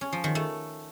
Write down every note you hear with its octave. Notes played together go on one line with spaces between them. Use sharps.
C#4
F3
D#3
A3